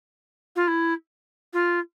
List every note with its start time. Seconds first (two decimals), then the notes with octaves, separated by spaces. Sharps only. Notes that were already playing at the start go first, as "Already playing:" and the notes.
0.56 F4
0.68 E4
1.53 F4